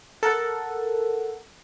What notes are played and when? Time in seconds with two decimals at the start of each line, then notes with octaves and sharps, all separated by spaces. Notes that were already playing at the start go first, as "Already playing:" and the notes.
0.23 A4 A#4 F#5